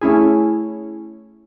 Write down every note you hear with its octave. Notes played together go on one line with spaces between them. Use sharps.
A3 C#4 E4 G#4